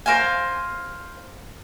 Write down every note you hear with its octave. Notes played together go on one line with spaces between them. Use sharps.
A#4 C5 F5 G#5